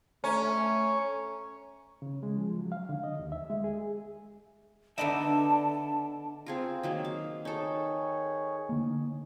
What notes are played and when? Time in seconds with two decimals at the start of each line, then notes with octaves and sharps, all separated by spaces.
0.24 A3 C#4 C#5 A#5
2.02 C#3
2.23 G#3
2.37 F3
2.59 F#3
2.72 F5
2.89 D3
3.03 D#5
3.19 D#2
3.32 E5
3.50 G#3
3.64 G#4
4.98 D3 B3 D#4 D5 E5 A5
6.46 C4 F4 G#4 A#4
6.83 D#3 F#3 A#3 D#6
7.05 F5
7.45 D#3 D#4 G#4 A4 C#5
8.69 D3 A#3